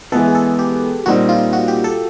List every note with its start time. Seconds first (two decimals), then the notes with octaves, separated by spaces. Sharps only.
0.12 E3 G#3 B3 A4
0.28 G#4
0.35 A4
0.59 G4
1.06 A#2 G3 C4 D#4 F#4
1.29 F4
1.53 F#4
1.68 G4
1.84 A4